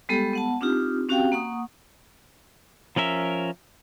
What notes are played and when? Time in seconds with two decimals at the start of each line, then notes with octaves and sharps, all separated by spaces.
0.09 G3 G#3 B3 G4 A4
0.33 B3 F#5 A5
0.61 C4 D4 D#4 F4 G4
1.08 C4 C#4 F#4 G4 F5 G5
1.32 A#3 F#5 C#6 D#6
2.96 F3 C#4 A#4 E5